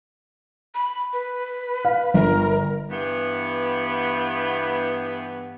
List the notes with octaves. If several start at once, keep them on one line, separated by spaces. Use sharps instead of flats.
B5
B4
F5
G1 A#4
G2 E3 B3